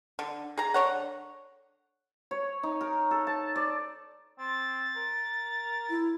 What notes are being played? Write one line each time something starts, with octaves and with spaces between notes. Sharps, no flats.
D3
G#4 A#5
D3 C#5 F#5
C#5
D#4
A#4
A4
A5
D5
C4 A6
A#4
E4